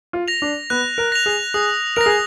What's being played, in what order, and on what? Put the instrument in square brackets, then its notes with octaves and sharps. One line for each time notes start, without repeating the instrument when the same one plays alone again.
[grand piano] F4
[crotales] A#6 F7
[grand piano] D4
[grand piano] B3 [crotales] F#6
[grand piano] A#4
[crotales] A#6 F7
[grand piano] G#4
[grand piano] G#4 [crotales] D#6
[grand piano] A#4 [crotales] A#6 F7
[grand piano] G#4